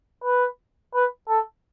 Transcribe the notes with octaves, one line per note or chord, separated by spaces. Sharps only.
B4
B4
A4